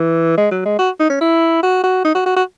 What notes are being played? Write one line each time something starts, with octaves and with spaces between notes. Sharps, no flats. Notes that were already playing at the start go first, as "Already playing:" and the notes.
Already playing: E3
G#3
F#3
G#3
F#4
D#4
C#4
E4
F#4
F#4
D#4
F#4
F#4
F#4